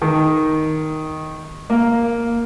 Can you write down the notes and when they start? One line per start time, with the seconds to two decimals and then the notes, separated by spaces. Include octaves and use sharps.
0.02 D#3
1.70 A#3